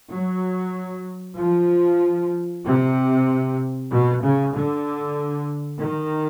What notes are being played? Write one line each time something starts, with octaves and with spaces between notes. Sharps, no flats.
F#3
F3
C3
B2
C#3
D3
D#3